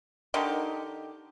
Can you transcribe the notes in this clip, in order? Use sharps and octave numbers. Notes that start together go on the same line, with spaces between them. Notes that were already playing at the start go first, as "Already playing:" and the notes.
D3 D#3 D#4 G4